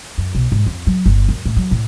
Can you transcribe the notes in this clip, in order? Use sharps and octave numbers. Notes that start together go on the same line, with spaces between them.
F#2
B1
G#2
F2
F#3
G1
F#2
A2
F#3
A2